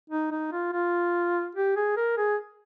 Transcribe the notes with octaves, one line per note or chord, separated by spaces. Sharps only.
D#4
D#4
F4
F4
G4
G#4
A#4
G#4